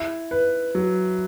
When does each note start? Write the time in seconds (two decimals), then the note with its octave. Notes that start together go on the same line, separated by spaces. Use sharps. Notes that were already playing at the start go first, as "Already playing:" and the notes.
Already playing: E4
0.31 B4
0.75 F#3